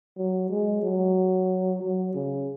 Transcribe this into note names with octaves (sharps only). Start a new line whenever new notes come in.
F#3
G#3
F#3
F#3
C#3